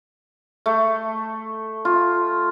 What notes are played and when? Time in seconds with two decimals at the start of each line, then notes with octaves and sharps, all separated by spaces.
0.66 A3
1.85 F4